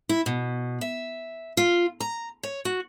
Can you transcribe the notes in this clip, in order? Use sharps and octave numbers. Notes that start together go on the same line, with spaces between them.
E4
B2
E5
F4
A#5
C#5
F#4